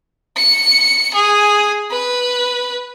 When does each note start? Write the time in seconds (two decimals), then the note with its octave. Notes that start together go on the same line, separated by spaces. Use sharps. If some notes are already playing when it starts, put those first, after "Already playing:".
0.37 C#7
1.14 G#4
1.91 B4